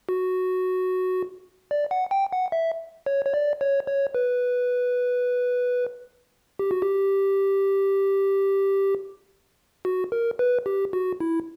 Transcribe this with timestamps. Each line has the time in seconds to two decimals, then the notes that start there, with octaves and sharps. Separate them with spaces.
0.09 F#4
1.71 D5
1.91 F#5
2.11 G5
2.33 F#5
2.52 E5
3.06 C#5
3.26 C#5
3.34 D5
3.61 C#5
3.87 C#5
4.15 B4
6.59 G4
6.71 F#4
6.82 G4
9.85 F#4
10.12 A#4
10.39 B4
10.66 G4
10.93 F#4
11.20 E4